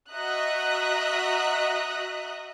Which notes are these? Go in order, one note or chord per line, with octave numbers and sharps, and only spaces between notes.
F#4 D#5 E5 A#5 D#6 F#6